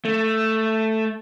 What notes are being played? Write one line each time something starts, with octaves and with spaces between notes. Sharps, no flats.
A3